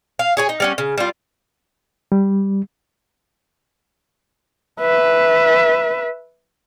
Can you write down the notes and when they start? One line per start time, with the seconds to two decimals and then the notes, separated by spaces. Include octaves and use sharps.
0.19 F5
0.37 G#4 C#5 G#5
0.49 D#4
0.60 G3 C#4 F#5
0.78 C#3
0.98 G3 F4
2.12 G3
4.81 B4 E5